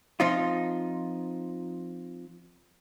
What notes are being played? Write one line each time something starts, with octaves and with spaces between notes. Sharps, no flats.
F3 C4 D#4 F4